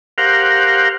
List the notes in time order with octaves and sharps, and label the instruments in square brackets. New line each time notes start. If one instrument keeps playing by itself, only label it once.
[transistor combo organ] G4 A#4 C5 F5 F#5